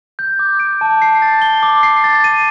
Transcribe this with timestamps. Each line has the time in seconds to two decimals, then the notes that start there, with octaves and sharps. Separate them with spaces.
0.19 G6
0.39 D6
0.60 D7
0.81 A5
1.02 C7
1.22 A6
1.42 G7
1.63 D6
1.83 C7
2.04 A6
2.24 D#7